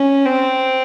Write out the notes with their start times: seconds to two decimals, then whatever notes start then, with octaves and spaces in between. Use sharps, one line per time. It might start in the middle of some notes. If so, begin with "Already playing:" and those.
Already playing: C#4
0.26 C4